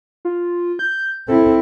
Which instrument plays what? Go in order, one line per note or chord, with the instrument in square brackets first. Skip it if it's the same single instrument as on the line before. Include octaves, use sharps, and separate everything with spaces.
[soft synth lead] F4
G6
[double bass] C4 E4 [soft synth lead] A4